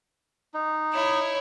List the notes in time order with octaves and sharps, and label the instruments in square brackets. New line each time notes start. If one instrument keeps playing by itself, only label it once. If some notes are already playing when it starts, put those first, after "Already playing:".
[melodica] D#4
[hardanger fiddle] E4 C#5